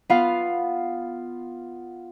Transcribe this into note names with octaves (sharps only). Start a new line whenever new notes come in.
B3 F4 F5